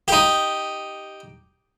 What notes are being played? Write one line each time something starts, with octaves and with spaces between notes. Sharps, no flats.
D#4 G4